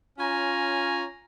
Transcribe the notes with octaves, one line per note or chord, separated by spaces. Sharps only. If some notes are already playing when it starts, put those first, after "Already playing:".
C#4 F4 C#5 G#5 A#5